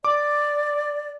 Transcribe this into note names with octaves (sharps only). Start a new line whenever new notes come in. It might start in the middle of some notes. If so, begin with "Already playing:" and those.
D5 D6